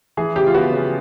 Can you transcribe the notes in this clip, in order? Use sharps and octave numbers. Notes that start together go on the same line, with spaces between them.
E3 G#4
C#3 G4
F4
B3 F#4
C#3